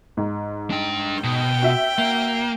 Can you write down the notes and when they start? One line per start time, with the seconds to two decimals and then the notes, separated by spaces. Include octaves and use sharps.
0.17 G#2
0.71 D4 G5
1.24 B2 G5
1.63 F#4 E5
1.99 A#3